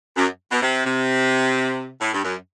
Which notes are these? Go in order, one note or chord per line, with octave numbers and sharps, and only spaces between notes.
F#2
B2
C3
C3
A2
G2
F#2